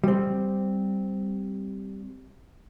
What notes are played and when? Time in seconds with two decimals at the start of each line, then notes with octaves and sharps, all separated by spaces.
0.04 G3 C4